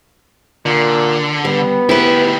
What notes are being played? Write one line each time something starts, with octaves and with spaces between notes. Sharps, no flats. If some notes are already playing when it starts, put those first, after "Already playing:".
A#2 D3
G3 B3
D2 E4 G4 B4